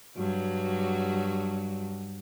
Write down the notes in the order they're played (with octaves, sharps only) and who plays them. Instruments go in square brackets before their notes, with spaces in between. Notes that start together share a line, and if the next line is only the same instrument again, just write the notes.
[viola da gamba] G2 F#3 F#4